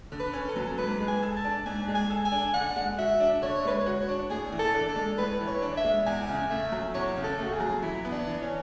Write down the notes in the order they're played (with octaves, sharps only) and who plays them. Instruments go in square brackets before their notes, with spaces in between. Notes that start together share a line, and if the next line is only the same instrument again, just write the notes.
[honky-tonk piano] D3
[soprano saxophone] B4
[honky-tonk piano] C#4
[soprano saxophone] A4
[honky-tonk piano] F#3
[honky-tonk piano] G#2 [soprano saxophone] B4
[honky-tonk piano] G#3
[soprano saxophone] G#5
[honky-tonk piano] A4
[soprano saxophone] A5
[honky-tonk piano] D4
[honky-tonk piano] G#2 [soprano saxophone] G#5
[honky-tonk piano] G#3
[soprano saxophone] G#5
[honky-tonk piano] A4
[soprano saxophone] G#5
[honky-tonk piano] D4
[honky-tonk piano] D3 [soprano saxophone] F#5
[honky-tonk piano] G#3
[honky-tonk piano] F#4 [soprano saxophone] E5
[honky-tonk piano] D4
[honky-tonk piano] D3 [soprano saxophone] C#5
[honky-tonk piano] G#3 [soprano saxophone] B4
[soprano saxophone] C#5
[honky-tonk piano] F#4
[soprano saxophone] C#5
[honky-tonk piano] D4
[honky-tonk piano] A2 [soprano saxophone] G#4
[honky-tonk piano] E3
[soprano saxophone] A4
[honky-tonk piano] D4
[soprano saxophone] A4
[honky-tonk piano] G#3
[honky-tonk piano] A2 [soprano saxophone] B4
[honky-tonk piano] E3
[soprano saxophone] C#5
[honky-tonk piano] D4
[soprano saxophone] E5
[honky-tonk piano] G#3
[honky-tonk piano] E2 [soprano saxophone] G#5
[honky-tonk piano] C#3
[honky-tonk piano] A3 [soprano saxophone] E5
[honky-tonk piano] F#3
[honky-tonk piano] E2 [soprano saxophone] C#5
[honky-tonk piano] C#3
[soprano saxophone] A4
[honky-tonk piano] A3 [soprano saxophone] F#4
[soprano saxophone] G#4
[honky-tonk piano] F#3
[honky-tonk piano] E3 [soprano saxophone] E4
[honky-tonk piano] B3
[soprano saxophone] D4
[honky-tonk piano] E3
[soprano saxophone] C#4